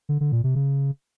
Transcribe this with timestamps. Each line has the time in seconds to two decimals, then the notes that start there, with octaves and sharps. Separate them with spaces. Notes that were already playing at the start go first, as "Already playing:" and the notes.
0.09 D3
0.20 D3
0.32 A#2
0.44 C3
0.55 C#3